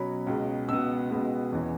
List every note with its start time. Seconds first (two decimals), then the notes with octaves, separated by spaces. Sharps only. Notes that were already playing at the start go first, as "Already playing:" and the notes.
Already playing: B2 F#3 C#4 B5
0.27 C#2 B2 G#3
0.68 C#2 B2 B3 E6
1.10 C#2 B2 G#3 B3
1.52 E2 E3 C#4